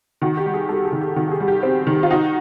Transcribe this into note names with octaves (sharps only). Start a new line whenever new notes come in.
D#3 F#4
G4
G3
G#4
G3 A4
G#4
D#3
G4
D#3 F#4
G4
G#4
G3
G4
C4
D#3
F4
D#4 F#4